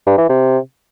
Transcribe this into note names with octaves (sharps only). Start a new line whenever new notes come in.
G2
E3
C3